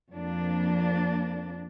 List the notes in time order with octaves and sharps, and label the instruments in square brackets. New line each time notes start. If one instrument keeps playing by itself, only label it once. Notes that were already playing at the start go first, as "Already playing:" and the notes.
[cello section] F2 A#3 D4